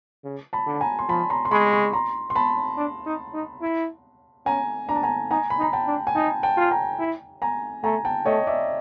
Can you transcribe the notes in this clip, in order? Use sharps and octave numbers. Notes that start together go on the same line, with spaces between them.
C#3
A5 B5
D3
G#5 A#5
C6
F3 A5 B5
A#5 C6
C6
G#3 B5 C#6
B5 C#6
A#5 C6
C6
A5 B5
D4
D#4
D#4
E4
C#4 G#5 A#5
D4 A#5
A5
G#5 A#5
D#4 G#5 A#5
B5
D#4 A#5
G5 A5
D4
G#5
D#4 G5 A5
G5 A5
F4
G#5 A#5
E4
G#5 A#5
A3 G#5 A#5
G5 A5
A3 C#5 D#5
D5 E5